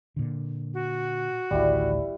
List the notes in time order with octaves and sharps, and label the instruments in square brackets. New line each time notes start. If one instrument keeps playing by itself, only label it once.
[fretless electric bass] A#2 D3
[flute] F#4
[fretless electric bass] A1 D2 D#3 [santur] G3 E4